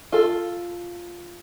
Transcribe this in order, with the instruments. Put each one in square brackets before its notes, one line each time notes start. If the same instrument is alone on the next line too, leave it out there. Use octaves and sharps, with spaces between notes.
[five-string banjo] F4 A4